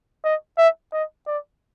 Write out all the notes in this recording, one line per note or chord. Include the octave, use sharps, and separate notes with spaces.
D#5
E5
D#5
D5